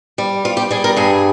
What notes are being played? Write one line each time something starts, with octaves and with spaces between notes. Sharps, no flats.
G3
G3 F4
G4
G3 G#4
A#4
G2 G#4